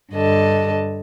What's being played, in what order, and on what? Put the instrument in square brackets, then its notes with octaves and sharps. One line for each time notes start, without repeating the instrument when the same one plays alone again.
[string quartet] G2 D3 D#5 A5